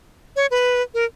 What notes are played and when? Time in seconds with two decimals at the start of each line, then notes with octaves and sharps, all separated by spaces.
0.36 C#5
0.51 B4
0.94 A#4